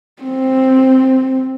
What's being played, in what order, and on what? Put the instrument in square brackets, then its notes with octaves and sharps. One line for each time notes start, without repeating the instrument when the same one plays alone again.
[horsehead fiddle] C4